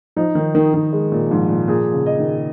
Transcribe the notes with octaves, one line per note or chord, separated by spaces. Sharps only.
F3 D#4
D#3
D#3 A#4
D#3
G#3
A#2
G#2 F3
A#2
A#2 G#4
C#3
D#5
D#3